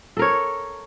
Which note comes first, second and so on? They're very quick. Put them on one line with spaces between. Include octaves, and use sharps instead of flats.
A4 A#4 C#5